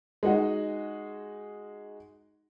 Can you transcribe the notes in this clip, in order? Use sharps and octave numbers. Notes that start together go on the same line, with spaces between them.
G#3 D#4 F#4 D#5